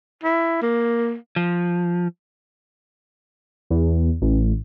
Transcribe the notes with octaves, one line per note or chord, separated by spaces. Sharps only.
E4
A#3
F3
E2
A1